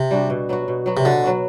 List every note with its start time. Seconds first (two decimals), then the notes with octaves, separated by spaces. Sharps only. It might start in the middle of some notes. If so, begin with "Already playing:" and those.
Already playing: C3
0.11 G3 D4 F#4
0.30 B2
0.49 F#3 B3 F#4
0.68 B2
0.86 F#3 B3 F#4
0.97 C3
1.05 B2 D3
1.24 F#3 B3 F#4